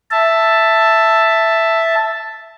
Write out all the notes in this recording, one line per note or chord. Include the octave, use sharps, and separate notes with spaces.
E5 A5